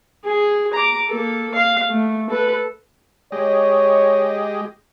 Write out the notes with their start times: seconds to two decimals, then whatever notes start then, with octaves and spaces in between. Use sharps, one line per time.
0.25 G#4
0.74 A#5 D6
1.08 A#3 A4
1.55 F5
1.90 A3
2.30 A4 B4
3.32 G#3 G4 C#5 D#5